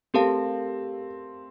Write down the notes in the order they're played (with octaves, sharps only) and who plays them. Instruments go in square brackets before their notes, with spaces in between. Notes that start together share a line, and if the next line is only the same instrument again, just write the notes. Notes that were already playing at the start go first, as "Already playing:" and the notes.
[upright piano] A3 C4 [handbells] G4 A#4 F5 A5